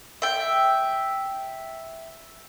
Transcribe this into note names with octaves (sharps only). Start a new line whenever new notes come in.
E5 G5